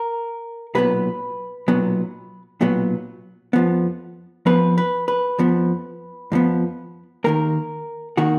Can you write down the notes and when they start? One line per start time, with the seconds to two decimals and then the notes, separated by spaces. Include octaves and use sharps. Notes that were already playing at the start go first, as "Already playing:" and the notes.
Already playing: A#4
0.75 B1 A#2 F#3 B3 B4
1.68 B1 A#2 F#3 B3
2.61 B1 A#2 F#3 B3
3.53 F2 F3 B3
4.46 F2 F3 B3 B4
4.78 B4
5.08 B4
5.38 F2 F3 B3
6.32 F2 F3 B3
7.24 D#2 D#3 A#3 A#4
8.17 D#3 A#3 F#4